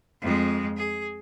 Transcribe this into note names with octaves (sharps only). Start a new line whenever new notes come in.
F2 G#3
G#4